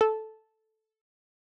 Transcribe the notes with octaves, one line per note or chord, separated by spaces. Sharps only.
A4